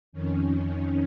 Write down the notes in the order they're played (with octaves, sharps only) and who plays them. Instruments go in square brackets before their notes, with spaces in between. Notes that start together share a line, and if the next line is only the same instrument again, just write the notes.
[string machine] F2 D#3 C#4